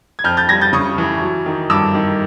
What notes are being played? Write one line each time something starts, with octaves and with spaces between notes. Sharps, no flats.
G#6
F2 F6 G6
G6 A6
G3 G#6 A#6
G6 A6
C#3 C#6 D#6
E3
F#3
D#3
G2 D6 E6
D#3